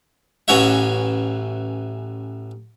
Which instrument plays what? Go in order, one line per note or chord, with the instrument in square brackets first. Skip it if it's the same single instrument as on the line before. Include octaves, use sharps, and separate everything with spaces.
[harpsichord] A1 E3 C#4 F#4 C#5 E5